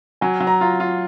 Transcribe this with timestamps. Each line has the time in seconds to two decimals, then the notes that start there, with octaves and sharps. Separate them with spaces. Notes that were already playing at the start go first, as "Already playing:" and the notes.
0.21 F#3 G#5
0.40 F#3
0.47 A#5
0.61 F4
0.80 F4